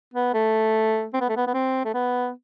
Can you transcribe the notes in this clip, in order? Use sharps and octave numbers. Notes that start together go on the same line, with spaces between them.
B3
A3
C4
B3
A3
B3
B3
C4
A3
B3